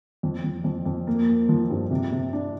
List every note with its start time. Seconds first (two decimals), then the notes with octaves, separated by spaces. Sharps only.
0.23 F2
0.44 F2
0.64 F2
0.86 F2
1.07 A#3
1.28 A#3
1.49 F3
1.70 G2
1.91 C3
2.12 C3
2.33 D4